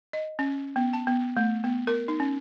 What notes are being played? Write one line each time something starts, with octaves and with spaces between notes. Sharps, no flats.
D#5
C#4
B3
A5
B3
A3
B3
A#4
D#4
C#4